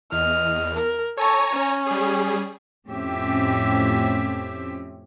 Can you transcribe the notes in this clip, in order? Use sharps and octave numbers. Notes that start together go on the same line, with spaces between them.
E2 D#5 F6
A#4
A4 C#5 G#5 A#5 C#6
C#4
G3 G#4
F2 A2 C4 C#4 G4 E5